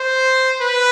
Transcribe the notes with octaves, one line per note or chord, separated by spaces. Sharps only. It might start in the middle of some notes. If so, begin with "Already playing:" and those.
Already playing: C5
B4